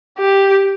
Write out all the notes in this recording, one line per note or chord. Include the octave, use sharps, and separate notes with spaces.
G4